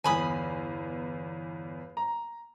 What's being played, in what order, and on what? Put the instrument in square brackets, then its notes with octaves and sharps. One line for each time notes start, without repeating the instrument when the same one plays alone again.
[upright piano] G1 E2 [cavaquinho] G#5 B5 D#6
[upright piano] A#5